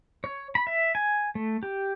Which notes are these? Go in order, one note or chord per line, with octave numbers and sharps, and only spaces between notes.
C#5
B5
E5
G#5
A3
G4